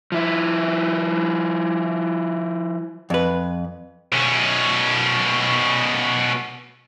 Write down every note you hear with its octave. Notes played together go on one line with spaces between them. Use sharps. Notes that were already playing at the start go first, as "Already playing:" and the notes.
F3 E4
F2 B4
B2 C#4